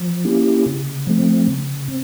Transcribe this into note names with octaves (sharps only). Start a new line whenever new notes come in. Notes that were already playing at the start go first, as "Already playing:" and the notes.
Already playing: F3
A#3 C#4 E4 G4
C#3
F3 A3 C4
C#3
C4